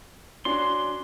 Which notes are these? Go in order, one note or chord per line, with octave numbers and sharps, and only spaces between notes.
C#4 D4 F#4 C6